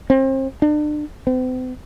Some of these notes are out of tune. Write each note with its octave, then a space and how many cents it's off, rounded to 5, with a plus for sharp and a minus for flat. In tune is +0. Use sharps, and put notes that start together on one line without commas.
C4 +35
D4 +35
C4 -45